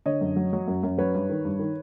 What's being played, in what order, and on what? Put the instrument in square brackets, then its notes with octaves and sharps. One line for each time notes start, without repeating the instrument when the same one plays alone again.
[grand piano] D3 C#5 D#5
F#2
F#3
F#3
F#2
F#2
F#3 B4 C#5
G2
D#3
G2
D#3